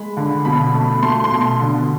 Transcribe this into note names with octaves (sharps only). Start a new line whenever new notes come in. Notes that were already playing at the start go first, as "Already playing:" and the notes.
Already playing: G#3 B5
D3
B2 B5
A3
A3 C6
C6
B2
D3